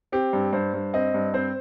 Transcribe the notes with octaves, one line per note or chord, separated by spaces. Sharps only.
C4 G4
G2
G2 C5
G2
C4 D#5
G2
C4 C5